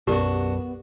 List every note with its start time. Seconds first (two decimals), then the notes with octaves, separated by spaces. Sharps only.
0.07 B1 F#2 B3 D4 F#4 G4 A#4